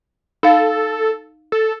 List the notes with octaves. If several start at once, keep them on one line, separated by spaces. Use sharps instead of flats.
D#4 A4 F5
A4